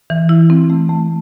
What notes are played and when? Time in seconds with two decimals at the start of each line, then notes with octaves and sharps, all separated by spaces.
0.10 E3
0.29 E4
0.50 C4
0.70 A3
0.89 A3